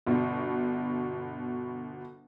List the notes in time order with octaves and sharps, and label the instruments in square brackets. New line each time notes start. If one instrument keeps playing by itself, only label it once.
[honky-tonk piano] G1 B2